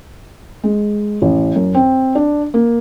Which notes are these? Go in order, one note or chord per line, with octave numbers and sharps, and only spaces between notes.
G#3
A1
F#2
C4
D4
A#3